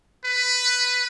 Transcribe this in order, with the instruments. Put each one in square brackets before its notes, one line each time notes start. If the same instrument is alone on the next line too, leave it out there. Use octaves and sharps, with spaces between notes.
[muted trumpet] B4